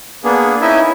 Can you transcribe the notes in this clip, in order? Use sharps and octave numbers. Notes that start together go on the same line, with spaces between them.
A#3 B3 D4 G#4
C#4 D#4 E4 D#5 E5 G#5